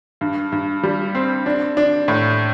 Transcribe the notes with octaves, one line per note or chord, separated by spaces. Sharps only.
G2
G2
G3
C4
D4
D4
A2